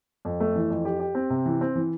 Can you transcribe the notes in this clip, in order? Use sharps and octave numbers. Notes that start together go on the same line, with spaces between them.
F2
A3
E3
F2
G4
G4
C4
C3
E3
C4
E3